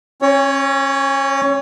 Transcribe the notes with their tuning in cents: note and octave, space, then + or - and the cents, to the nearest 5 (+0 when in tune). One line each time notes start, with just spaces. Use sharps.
C#4 -30 C#5 +15